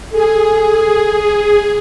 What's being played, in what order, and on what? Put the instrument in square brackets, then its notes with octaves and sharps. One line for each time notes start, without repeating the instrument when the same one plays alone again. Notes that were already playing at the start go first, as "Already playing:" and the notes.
[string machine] G#4 [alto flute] A4